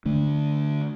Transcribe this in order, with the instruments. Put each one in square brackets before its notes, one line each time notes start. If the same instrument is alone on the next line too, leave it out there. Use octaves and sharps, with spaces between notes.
[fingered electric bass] D3 A3 D4